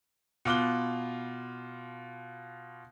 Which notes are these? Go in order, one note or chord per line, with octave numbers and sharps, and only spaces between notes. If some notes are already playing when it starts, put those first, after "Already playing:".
B2 F4 D6 F#6 G7